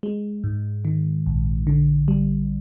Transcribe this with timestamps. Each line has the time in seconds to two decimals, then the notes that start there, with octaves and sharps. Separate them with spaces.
0.03 G#3
0.44 G#2
0.85 D#3
1.26 A#1
1.67 D3
2.08 G3